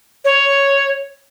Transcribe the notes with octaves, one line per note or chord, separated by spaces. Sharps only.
C#5